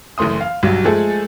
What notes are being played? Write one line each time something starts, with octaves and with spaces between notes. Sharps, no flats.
F#1 E3 A3 C6 D#6
F5
B1 G2 F#3
F3 G#3 A3 G#4 A4